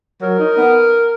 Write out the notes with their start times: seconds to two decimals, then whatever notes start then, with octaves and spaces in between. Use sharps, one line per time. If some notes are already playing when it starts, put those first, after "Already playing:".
0.21 F#3 A#4
0.39 D#4
0.56 B3